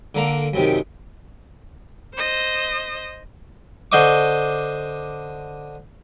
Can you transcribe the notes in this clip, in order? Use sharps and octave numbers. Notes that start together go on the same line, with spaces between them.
D3 A#3 A#5
F#2 C3 D#3
C5 D#5
D3 C5 D#5 C#6 D6